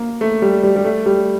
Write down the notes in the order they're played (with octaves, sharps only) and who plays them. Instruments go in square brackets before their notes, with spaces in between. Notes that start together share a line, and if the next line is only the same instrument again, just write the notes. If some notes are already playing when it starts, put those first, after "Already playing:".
Already playing: [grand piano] A#3
A3
G3
G3
G3
A3
G3